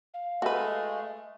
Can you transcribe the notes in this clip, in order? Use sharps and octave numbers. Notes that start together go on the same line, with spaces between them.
F5
G#3 A3 F#4 B4